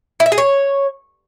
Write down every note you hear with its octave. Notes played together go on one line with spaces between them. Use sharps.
E4
E5
G#4
C#5